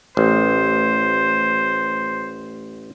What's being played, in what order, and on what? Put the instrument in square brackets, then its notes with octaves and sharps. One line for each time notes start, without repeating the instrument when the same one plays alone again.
[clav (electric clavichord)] A1 [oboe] C5